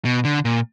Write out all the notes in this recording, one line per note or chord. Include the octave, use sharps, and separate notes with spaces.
B2
D3
A#2